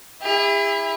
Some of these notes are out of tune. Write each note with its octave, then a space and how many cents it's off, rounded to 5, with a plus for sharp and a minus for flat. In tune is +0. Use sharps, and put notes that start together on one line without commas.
E4 +0 G#4 -45